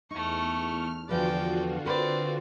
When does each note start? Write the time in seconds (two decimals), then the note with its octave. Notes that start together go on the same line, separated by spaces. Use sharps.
0.11 E2 A3 D#4 C#6 F6
1.09 E2 D3 F3 F4 F#4 B4 D5 G5
1.85 C4 A#4 B4 D5